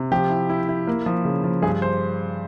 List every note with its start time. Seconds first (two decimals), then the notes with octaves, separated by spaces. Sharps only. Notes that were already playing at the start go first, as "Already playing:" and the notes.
Already playing: C3
0.11 F3 G4
0.30 E4
0.49 E4
0.69 E4
0.87 A#3
1.06 F3
1.25 C#3
1.44 F3
1.62 G2 G#4
1.82 C5